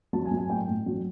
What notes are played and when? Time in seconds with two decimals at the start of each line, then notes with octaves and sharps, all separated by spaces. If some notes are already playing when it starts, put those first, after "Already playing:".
0.13 F#3 A5
0.25 G#5
0.31 F#3
0.37 G#5
0.50 A2 G5
0.68 A2
0.86 F#3